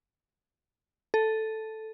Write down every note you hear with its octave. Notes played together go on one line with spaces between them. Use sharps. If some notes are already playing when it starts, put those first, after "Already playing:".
A4